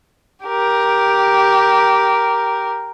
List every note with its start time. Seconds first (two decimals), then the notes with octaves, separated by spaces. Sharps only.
0.45 G4 A#4